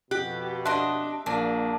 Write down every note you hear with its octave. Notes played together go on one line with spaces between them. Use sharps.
F2 B2 G4 F#6
D4 D#5 E5 C6 F#6
A#1 A#3 D4